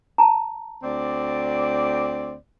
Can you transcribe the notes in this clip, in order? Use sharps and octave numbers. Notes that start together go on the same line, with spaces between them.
A5 A#5
D2 C4 D5